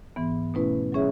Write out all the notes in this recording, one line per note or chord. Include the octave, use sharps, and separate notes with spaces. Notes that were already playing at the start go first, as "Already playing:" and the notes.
G#2 E3 B3
B2 A3 C#4 E4 B4
F#3 C#4 G#4 C#5 E5